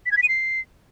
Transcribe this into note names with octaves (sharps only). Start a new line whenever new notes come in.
B6
G#6
B6
D#7
C7